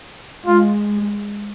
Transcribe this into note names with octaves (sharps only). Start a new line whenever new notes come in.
G#3 F4